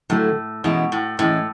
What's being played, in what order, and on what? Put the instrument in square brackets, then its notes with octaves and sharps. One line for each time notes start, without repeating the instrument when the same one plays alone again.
[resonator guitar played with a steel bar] A2 [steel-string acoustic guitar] D3 F#3 A3 E4
[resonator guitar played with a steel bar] B2 [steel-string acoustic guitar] E3 G#3 C#4 E4
[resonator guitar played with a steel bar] A2
[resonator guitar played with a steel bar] A2 [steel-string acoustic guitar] E3 G#3 C#4 E4